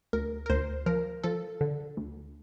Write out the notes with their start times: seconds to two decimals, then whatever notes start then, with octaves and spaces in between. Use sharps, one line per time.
0.13 D2 A#4
0.46 A#4
0.50 D2 C5
0.86 F3 A#4
1.23 F3 A4
1.61 D3
1.97 D2